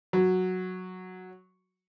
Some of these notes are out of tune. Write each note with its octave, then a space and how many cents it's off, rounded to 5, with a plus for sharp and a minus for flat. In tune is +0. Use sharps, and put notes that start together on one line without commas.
F#3 -5